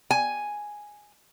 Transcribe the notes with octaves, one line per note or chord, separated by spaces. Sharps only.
G#5